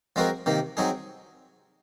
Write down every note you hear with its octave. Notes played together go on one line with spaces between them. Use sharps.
F3 G#3 C4 F#4 A#4
C3 D#3 A#3
F#3 C4 D#4 G#4